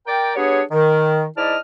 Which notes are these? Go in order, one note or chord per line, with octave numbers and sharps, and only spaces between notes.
A#4 D5 G5
B3 D4 G4 G#4 C#5
D#3
G#2 E4 D5 D#5 A5 F6